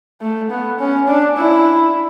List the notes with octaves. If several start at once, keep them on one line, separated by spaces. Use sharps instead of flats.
A3
B3
C#4
D4
E4